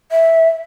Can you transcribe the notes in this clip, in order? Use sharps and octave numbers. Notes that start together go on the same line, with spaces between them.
E5